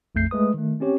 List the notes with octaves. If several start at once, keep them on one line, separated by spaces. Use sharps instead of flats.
A#1 F2 A3 G6 C7
G#3 A3 B4 D#6
D#3 A3
C4 C#4 G4 C#5